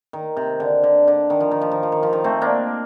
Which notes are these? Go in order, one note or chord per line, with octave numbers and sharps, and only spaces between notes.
D#3
C3
D3
D3
D3
D#3
F3
D#3
F3
D#3
F3
D#3
F3
D#3
A3 C4
A#3 D4